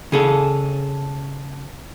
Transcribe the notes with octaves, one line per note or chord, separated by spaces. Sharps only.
C#3 G#4 A4